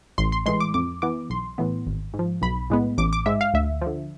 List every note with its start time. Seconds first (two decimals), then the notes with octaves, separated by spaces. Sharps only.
0.18 A1 C6
0.32 C6
0.46 A2 E3 G#3 C6
0.60 D6
0.74 F2 D6
1.02 E3 B3 D6
1.30 B1 C6
1.58 A2 E3 B3
1.86 G#1
2.14 G#2
2.19 F3
2.42 B1 B5
2.70 A2 G#3 B3
2.98 A1 D6
3.13 D6
3.26 G#2 G#3 E5
3.41 F5
3.54 D2 E5
3.82 D3 F3